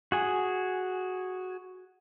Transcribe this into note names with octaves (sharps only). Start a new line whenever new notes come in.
F#4 G#4 G#5